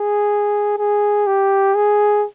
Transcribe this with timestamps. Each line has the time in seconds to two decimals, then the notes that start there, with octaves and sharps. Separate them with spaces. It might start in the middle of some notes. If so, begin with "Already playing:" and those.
Already playing: G#4
0.78 G#4
1.27 G4
1.75 G#4